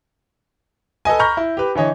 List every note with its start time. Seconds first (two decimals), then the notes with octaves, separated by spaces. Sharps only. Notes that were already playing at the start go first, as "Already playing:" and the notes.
1.05 A4 B4 D#5 G#5
1.20 A#5 B5 C#6 F6 G6 A#6
1.37 E4
1.57 G4 B4
1.75 D3 E3 C#5 D#5